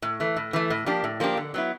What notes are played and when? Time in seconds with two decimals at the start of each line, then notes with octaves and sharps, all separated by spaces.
0.02 A2
0.20 E3 A3
0.36 A2
0.53 E3 A3
0.70 A2
0.86 F3 A#3 D4 G4
1.04 A2
1.20 F3 A#3 D4 G4
1.37 D3
1.54 F#3 B3 E4